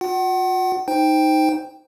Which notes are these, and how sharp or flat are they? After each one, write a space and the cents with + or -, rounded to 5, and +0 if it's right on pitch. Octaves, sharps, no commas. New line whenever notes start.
F4 +45 F#5 +30
D#4 +0 C5 +0 G5 +5